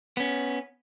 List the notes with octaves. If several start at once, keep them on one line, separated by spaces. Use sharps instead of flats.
B3 C#4